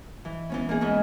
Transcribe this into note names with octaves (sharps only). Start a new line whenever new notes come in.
E3
E3 B3 C#4
A#3 B3 D#4 G#4
E2 G#2 C#4 B4 G#5